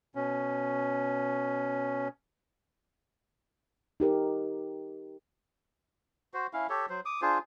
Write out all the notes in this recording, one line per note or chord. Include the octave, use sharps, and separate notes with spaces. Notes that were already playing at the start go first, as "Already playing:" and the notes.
B2 C#4
D#4 G4 A#4
F#4 C5
C#4 E4 F5
G4 A4 C#5
F#3 C5
D6 D#6
D4 F4 G#4 C5